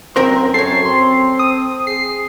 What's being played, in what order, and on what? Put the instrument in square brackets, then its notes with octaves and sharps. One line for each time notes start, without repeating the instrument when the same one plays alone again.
[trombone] F#2 [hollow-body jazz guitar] C4 A#4 C5
[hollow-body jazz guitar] A4 C#5 [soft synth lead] C7
[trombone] C4 [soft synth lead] C6
[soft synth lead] D#6
[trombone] G#4 [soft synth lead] C7